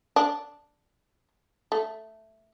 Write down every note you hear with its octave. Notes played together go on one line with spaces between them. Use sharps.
D4
A3